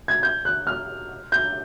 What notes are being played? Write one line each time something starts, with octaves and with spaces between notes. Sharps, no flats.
G#6
G6
F#6
F6
G6